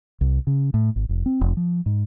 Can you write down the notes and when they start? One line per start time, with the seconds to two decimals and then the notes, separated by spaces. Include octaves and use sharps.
0.21 C2
0.47 C#3
0.74 A2
0.96 G#1
1.09 F1
1.26 C4
1.41 F1
1.57 F3
1.86 G#2